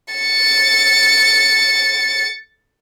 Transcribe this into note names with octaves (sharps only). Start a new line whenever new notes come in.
A6 C#7